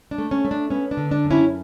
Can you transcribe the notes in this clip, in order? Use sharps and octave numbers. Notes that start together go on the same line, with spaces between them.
D4
A3
C#4
A3
D4
B3 C#4
D4
D3
D4
F#2
C#4 E4